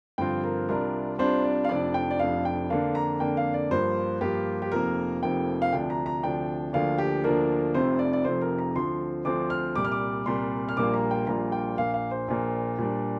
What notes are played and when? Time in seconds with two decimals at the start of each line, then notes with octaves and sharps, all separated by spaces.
0.18 G2 D3 F3 C4 F4 G5
0.43 A#4
0.69 C2 C3 G3 D4 F4 A#4
1.18 C2 C3 G3 D4 F4 C5
1.44 D5
1.65 F5
1.69 F1 F2 F3 D4 D5
1.94 G5
2.11 D5
2.19 F1 F2 F3 D4 F5
2.45 G5
2.70 F2 D3 A#3 D4 F5
2.95 A#5
3.20 F2 D3 A#3 D4 G5
3.37 F5
3.54 D5
3.71 G2 F3 A#3 F4 C5
4.21 G2 F3 A#3 F4 G4
4.62 G4
4.72 F1 F2 F3 A#3 A#4
5.23 F1 F2 F3 A#3 G5
5.62 F5
5.73 D2 C3 F3 D4 G5
5.90 A#5
6.06 A#5
6.23 D2 C3 F3 D4 G5
6.73 D2 D3 F3 A#3 D4 F5
6.98 G4
7.24 D2 D3 F3 A#3 D4 A#4
7.75 F1 F2 C3 F3 C5
7.99 D5
8.13 D5
8.25 F1 F2 C3 F3 C5
8.41 A#4
8.58 A#5
8.75 D2 D3 F3 C4 C6
9.25 D2 D3 F3 C4 D6
9.50 F6
9.75 C2 A#2 G3 D6
9.85 F6
9.92 D6
10.26 C2 A#2 G3 C6
10.69 F6
10.77 A#1 A#2 G3 A#3 F4 D6
10.94 A#5
11.11 G5
11.27 A#1 A#2 G3 A#3 F4 A#5
11.52 G5
11.77 A#1 A#2 A#3 F5
11.94 F5
12.11 C5
12.28 A#1 A#2 A#3
12.78 A#2 G3 D4